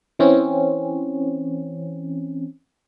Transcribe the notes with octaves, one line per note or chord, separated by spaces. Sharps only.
E3 C4 C#4